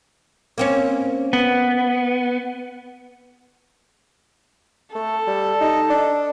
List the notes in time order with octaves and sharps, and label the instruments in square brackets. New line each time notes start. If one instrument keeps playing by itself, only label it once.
[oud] A#3 C4 C#4
[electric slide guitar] B3
[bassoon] A3 [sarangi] A4
[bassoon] G3
D#4
D4